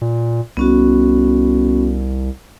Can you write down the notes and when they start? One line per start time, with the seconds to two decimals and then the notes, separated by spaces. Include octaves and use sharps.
0.01 A#2
0.57 C2 B3 C#4 F#4